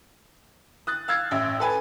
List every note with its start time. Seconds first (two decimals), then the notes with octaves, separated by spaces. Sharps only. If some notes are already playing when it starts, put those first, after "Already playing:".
0.87 D#6 F#6 A6
1.08 F5 E6 G#6 A6
1.31 A1 E5
1.60 A4 B4 G#5